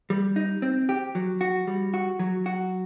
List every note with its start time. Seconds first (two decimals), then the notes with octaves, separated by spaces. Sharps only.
0.10 G3
0.36 D#4
0.62 C4
0.89 G4
1.15 F#3
1.41 F#4
1.67 G3
1.94 F#4
2.19 F#3
2.46 F#4